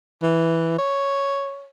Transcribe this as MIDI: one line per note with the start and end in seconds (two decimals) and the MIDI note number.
0.23 0.74 52
0.78 1.69 73